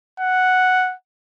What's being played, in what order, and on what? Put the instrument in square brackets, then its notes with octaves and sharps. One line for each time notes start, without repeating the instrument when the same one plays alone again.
[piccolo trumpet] F#5